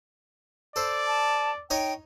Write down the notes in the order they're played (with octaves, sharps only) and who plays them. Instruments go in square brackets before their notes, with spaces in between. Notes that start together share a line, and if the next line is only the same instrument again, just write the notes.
[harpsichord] A4 C5 [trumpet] D5
[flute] A5
[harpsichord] D#4 C#5 D#5 [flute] G5